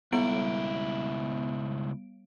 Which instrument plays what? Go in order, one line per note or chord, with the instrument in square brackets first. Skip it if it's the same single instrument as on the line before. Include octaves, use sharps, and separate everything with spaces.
[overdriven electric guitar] C#2 E4 [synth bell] G3 B3 D7